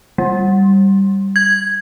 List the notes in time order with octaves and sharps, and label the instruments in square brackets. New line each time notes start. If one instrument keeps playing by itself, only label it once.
[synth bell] G3
G#6